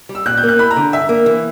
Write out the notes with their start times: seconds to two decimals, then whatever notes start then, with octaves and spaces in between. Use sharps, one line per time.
0.09 G3
0.15 E6
0.26 A#2 F#6
0.37 G6
0.43 A#3
0.48 F#6
0.59 E4 B5
0.71 A#5
0.76 D3
0.93 G2 E5
1.09 A#3
1.26 E3